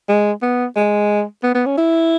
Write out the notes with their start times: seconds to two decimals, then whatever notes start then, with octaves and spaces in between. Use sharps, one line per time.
0.09 G#3
0.42 B3
0.76 G#3
1.43 B3
1.55 B3
1.66 C#4
1.78 E4